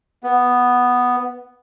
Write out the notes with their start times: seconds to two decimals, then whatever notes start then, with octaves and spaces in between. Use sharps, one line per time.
0.24 B3